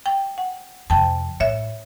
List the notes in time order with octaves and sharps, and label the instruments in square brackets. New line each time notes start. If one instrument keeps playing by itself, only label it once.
[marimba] G5
F#5
[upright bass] F2 C3 [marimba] G5 A5
[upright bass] A2 [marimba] C#5 E5